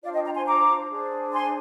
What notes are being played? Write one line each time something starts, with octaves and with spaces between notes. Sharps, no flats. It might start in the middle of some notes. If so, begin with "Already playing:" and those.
D4 F4 C5 D5 F5
D#5 G5
G5 A#5
G#5 C6
A#5 D6
D4 G#4 C5
G#5 C6